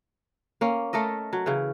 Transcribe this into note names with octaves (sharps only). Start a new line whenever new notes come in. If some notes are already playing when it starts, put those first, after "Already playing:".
A#3 C#4
A3 A4 A#4 D#5
F#3
C#3 E3